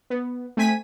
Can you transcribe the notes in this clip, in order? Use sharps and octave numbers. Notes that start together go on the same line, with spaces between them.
B3
A3 C4 G#5 B6 D#7